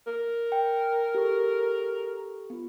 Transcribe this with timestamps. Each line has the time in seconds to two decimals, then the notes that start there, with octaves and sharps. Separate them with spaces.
0.07 A#4
0.52 G5
1.15 G4 A4 C#6
2.50 B3 F4